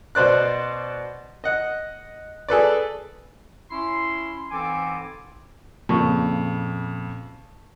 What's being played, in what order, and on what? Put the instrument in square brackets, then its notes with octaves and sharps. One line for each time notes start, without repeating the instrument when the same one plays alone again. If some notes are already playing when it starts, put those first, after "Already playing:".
[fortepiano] B2 C5 D5 F#6
D#5 F#5
G#4 A4 B4 D5
[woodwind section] C#4 E4 C6
G#2 E3 C4 A4 G#5 D6
[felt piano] F2 C#3 [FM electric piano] A#2 [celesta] A5 C#6